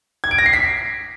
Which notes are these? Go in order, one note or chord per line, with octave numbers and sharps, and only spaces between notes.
G#6
D7
A#6
C7
B6